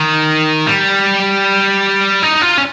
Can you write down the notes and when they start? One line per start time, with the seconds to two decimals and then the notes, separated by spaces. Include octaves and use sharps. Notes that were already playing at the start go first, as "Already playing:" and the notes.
Already playing: D#3
0.66 G3
2.23 D#4
2.42 F4
2.57 C#4